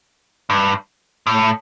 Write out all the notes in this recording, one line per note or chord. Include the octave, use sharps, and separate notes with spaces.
G2
A2